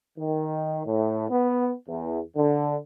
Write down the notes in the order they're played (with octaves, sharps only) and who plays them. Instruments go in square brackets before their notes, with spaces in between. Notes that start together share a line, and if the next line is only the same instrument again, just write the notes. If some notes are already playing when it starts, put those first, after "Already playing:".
[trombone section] D#3
A2
B3
E2
D3